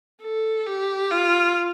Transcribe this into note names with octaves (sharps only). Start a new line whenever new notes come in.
A4
G4
F4